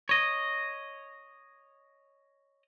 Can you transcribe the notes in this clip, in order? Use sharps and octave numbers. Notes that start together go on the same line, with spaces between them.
C#5 D#5